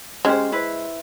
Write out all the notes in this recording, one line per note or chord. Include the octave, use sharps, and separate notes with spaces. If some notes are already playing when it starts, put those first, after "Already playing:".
G#3 C#4 G4 C5
E4 B4 C5